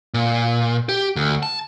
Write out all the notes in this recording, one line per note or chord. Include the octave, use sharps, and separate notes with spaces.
A#2
G4
D2
A5